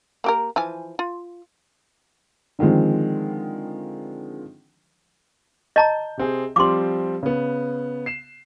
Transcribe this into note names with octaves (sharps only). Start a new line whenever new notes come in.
A#3 G4 A#4
E3 F3 G#5
F4
D3 D#3 F3 G#3 C4
D#5 A5 A#5 G6
C3 C4 G#4
F3 G3 C4 C6 D6
C#3 B3
C7 E7